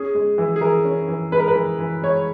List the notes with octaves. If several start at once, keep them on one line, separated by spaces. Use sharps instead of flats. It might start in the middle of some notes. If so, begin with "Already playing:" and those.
Already playing: C#4 G#4
G#3
E3
G#4
E3 A#4
C#4
E3
G#3 B4
A#4
B4
E3
E3
G#3 C#5